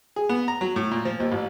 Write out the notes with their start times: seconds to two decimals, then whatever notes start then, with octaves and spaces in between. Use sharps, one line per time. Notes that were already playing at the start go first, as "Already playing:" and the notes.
0.16 G#4
0.29 B3
0.48 A#5
0.61 F#3
0.76 A2
0.91 A#2
1.05 F3
1.20 D#2
1.32 A1